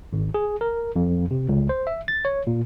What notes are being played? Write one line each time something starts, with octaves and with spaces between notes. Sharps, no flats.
G#1
G#4
A#4
F2
C3
C#2
C5
E5
A6
C#5
A#2